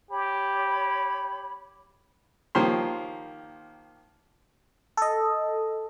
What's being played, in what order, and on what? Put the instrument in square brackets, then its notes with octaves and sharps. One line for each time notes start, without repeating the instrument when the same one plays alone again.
[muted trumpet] G4 [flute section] C#5 B5
[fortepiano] D#3 F3 A#3 G4 C#5 C6
[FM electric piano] A4 D#5